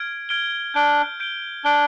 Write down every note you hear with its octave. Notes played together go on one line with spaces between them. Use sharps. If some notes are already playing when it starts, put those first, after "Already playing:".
Already playing: F6 G#6 D7
F6 G#6 D7 G7
D4 G6 D7 G7
G6 D7 G7
D4 G6 D7 G7